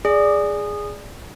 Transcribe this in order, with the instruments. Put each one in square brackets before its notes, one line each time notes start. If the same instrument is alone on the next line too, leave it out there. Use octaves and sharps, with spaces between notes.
[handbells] G#4 [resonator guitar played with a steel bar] D5